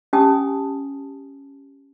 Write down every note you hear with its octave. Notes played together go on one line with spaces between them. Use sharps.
C#4 G4 G#5 A5 D#6